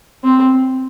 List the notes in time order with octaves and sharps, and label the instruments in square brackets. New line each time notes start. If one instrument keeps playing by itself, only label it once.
[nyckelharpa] C4